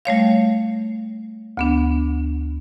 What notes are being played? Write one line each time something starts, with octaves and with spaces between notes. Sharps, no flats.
G3 A3 C#5 F5
D2 B3 D4